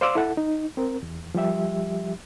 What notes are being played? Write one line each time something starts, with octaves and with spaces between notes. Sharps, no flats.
C5 D5 F5 C6 D6 E6
E4 A4 F#5 A5
D#4
C4 A#4
E2
F3 G3 G4 E5